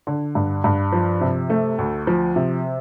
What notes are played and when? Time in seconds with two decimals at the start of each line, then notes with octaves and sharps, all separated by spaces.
0.07 D3
0.35 G2
0.64 G2
0.92 F3
1.21 C3
1.50 A3
1.78 D2
2.07 F3
2.36 C3